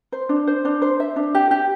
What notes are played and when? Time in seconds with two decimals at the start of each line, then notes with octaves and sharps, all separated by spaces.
0.12 C5
0.29 D4
0.47 C5
0.65 D4
0.82 C5
1.00 E5
1.16 D4
1.35 G4
1.51 G4